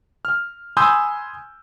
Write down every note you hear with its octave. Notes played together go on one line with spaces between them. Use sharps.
F6
G#5 B5 C6 D#6 E6 G6